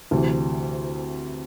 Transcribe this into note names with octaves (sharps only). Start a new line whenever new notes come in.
D2 C3 E3